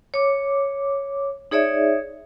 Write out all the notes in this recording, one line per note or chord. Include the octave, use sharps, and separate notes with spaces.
C#5 D6
D#4 G#4 C#5 D5 E5